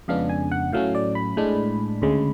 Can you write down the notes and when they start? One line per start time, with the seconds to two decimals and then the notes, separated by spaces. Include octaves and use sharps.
0.08 F2 C#3 G#3 B3 D4 F5
0.29 G#5
0.51 F#5
0.72 A2 F#3 A3 C#4 F5
0.95 D5
1.15 B5
1.37 A2 G#3 D4
2.02 D2 C#3 G#3